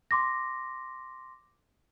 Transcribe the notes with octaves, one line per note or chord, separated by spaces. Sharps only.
C6 D6 A#6